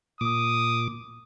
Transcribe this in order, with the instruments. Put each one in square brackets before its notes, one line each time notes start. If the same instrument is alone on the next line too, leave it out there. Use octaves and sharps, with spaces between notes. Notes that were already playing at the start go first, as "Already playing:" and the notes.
[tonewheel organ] A#2 D6 [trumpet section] D#6